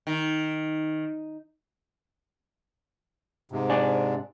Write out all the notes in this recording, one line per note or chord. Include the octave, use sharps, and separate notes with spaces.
D#3
G#2 C3
D4 D5 G#5